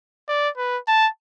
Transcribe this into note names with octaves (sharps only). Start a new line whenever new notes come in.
D5
B4
A5